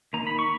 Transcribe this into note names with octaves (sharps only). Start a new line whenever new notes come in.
D#3 A#3 D#4 A#5
B5
C#6